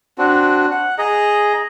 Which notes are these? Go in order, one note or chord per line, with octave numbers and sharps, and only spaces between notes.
C4 D4 F#4
F#5
G#4 D#5 A#5